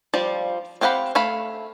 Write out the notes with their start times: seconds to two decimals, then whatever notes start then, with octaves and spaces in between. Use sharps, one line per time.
0.14 F3 G3 F4 D5
0.81 C4 G4 F5 F#5 B5
1.15 A3 F5 B5